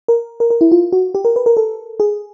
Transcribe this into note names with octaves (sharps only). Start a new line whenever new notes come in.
A#4
A#4
A#4
E4
F4
F#4
G4
A#4
B4
A#4
A4
G#4